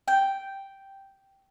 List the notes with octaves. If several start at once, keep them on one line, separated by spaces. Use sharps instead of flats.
G5